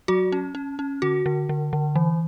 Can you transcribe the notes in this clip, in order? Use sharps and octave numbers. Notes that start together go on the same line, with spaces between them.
F#3 F#4
C#4
C#4
C#4
D3 F#4
D3
D3
D3
E3